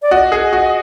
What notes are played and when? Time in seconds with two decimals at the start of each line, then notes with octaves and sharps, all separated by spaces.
0.02 D5
0.11 F#4 D#5
0.32 G#4
0.53 F#4